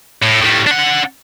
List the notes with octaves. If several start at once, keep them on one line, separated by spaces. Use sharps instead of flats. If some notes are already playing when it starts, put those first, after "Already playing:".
A2
A2 G3
D4 F#5